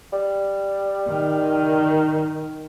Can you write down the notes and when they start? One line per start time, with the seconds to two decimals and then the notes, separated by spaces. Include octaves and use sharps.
0.13 G3
1.08 D#3